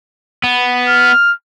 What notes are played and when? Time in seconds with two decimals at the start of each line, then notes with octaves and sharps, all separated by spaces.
0.44 B3
0.88 F6